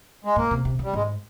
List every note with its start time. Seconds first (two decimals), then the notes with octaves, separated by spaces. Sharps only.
0.24 G#3
0.36 G#2 A#3
0.51 C3
0.65 C3
0.79 C#3
0.84 G3
0.94 G#2 G#3